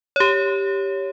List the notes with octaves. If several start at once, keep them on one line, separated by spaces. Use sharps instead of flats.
G4 C#5